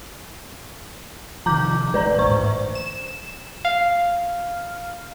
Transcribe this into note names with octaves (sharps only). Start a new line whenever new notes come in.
C3 D#3 F3 A#5 D6 G6
A1 G#3 B4 D5 A#5
A1 D2 G#2 C5 C#6
E7
F5